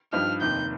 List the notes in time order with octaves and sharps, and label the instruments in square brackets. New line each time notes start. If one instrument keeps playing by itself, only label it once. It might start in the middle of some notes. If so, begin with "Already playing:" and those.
[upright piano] G2 F3 D#4 G4 [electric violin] F6
[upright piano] F1 D#2 D#3 [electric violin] G6